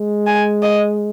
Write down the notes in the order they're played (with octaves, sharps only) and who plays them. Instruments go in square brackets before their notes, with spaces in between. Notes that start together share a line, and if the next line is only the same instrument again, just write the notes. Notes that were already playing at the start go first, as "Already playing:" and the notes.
Already playing: [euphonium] G#3
[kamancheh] G#5
D#5